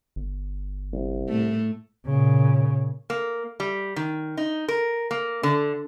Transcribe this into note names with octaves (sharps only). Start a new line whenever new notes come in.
G1
C2
A2 A3
A#2 C#3
A#3
G3
D#3
D#4
A#4
A#3
D3